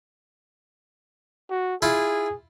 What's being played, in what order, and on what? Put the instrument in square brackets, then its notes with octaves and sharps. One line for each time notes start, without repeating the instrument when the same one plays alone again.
[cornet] F#4
[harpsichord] E4 F4 [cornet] G#4